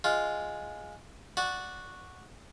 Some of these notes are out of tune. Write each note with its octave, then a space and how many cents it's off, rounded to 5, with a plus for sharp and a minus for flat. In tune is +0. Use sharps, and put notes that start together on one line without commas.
G#3 +0 F4 +0
F#4 -10 D5 +0